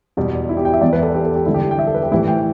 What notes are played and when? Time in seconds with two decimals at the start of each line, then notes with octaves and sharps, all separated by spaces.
0.17 E2 B2 G3
0.49 E4
0.57 G4
0.65 G5
0.74 E5
0.81 E2 E3 G3 D5
0.93 B4
1.03 A4
1.15 G4
1.25 A4
1.36 G4
1.46 G2 D3 G3 E4
1.54 G4
1.71 G5
1.79 E5
1.87 A4
1.95 B4
2.03 G4
2.11 A2 E3 G3 E4
2.28 G5